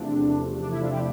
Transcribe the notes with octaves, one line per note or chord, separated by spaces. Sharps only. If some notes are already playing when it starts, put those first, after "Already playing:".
Already playing: E2 C3 F3 A3 D4
D4
E4
D4 F4
E4 G4